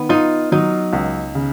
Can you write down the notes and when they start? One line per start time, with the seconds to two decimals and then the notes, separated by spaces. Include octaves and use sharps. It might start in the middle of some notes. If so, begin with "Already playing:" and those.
Already playing: D#3 B3
0.09 D#4 F4
0.52 F#3 D#4
0.93 C#2
1.35 C#3